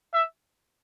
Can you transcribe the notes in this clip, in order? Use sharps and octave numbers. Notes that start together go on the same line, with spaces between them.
E5